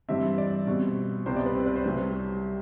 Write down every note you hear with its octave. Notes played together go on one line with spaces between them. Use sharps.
G2 E3 G3 C4 E5
D5
B2 G3 C4
C2 C3 G3 B3 C5
D5
B4
C4
B4
C5
C2 C3 F#3